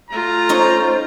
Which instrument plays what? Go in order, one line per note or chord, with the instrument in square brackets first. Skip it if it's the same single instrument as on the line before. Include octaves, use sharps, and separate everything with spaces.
[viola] A3 F4 [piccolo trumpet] A#5
[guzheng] C#4 D#4 C#5 [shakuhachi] C5